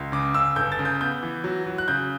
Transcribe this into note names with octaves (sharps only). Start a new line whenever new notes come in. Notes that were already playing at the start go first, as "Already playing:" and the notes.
Already playing: C#2
C#3 D6
C#3 E6
G1 G6
A6
C#3
G6
B3 G6
E3
F#3
F#3
F#6
C#3 G6